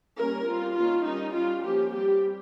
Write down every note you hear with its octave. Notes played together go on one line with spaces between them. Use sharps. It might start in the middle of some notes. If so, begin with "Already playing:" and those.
G3 A#3 C#4 A#4
G3 C4 F4
D#3 A#3 C#4 F4
G3 C#4 D#4
G3 C#4 F4
F3 A#3 C#4 G4
G3 C4 G4